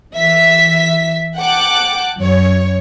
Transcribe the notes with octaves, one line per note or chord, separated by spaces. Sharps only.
E3 E5 B6
F#5 G5 A5 D6 F#6
F#2 C#5